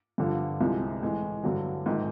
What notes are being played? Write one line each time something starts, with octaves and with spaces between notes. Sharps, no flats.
G2 D3 F3
C2 C3 F3 G#3
A2 E3 G#3
G2 D3 F#3
A#1 G#2 D#3